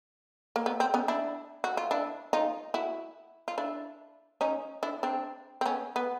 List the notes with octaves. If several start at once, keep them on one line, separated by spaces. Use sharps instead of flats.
A#3
B3
C4
B3 C#4
D4 E4
F#4
F4
D4 E4
D#4 F4
E4 F#4
F4
D4 E4
C#4 D#4
D4 E4
C4 D4
C4
B3 C#4
B3